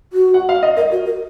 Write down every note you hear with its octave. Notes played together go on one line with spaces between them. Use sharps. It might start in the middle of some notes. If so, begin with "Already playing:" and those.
F#4
F#5
F5
D#5
A#4 D#5
F#4
A#4